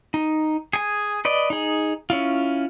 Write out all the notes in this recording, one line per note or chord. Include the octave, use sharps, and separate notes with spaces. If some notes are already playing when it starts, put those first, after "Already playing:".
D#4
G#4 G#5
B4 D5 D#5
D#4 G#4
C#4 E4 F4